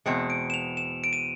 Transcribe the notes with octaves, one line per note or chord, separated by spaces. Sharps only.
E2 B2 G#3 C4 C#7
D7
E7
F7
E7
D7
D#7